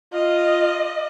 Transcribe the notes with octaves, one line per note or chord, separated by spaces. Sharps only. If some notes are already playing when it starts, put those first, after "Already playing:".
F4 D#5